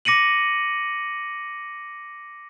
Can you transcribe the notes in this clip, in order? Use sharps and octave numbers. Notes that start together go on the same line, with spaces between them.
D6 A#6 C#7 D#7 F#7